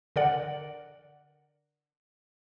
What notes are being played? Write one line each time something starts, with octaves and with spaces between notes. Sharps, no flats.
D3 A#4 D5 F#5